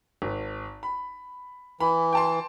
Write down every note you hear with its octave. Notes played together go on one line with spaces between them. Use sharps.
G#1
B5
E3 B5
G5 A5 C6